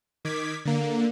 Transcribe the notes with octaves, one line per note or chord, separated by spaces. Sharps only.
D#3 D6 G#6 B6
D3 A#3